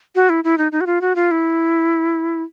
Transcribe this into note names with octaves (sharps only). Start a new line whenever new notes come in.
F#4
E4
E4
D#4
D#4
F#4
F4
F#4
F4
E4